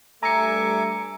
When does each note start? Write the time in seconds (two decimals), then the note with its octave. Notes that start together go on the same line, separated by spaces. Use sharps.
0.23 G2 G3 A3 E5 G#5 A#5 D6 C#7